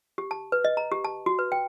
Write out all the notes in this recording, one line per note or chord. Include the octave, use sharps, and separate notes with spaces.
G4
A5
B4
D#5
A#5
G4
A5
F#4
B4
G5